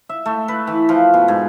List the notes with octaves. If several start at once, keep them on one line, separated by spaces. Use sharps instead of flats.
E5
A3
B4
E3
F3
B2
G#2